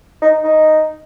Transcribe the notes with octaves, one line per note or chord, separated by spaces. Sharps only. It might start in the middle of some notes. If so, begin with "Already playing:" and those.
D#4
D#4